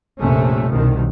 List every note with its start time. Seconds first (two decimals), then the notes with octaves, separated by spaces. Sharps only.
0.19 A#1 F2 C3 A3 C#4
0.71 C2 B2 D#3